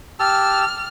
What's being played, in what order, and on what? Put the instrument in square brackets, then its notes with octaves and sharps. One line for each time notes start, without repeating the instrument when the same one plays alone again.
[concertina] G4 A5 E6 [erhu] F6